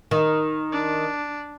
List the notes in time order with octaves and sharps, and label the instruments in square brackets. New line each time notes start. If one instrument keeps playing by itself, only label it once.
[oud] D#3
[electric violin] D4